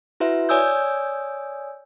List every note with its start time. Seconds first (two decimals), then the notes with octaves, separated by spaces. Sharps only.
0.20 E4 F#4 B4 E5
0.49 C#5 D5 G#5 D#6 E6 G6